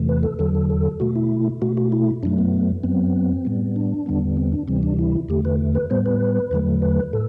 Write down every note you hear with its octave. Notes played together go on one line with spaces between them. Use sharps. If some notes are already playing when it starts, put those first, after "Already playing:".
Already playing: E2 C3 E3 A3
B4
A4
E2 D3 F#3 A4
A4
A4
B2 A3 F#4
E4
B2 A3 F#4
F#4
E4
F#2 F#3 A3 D4
B3
F#2 F#3 B3 C4
A2 G3 B3
D4
E2 D3 G3 B3
C4
D4
D2 C3 E3 G3 C4
D4
E4
E2 D3 A3 G4
B4
B4
A2 G3 B3 C5
B4
E2 D3 F#3 A3
B4
A2 A4